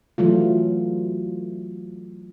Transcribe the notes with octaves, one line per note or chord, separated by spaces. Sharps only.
E3 F#3 A3 F4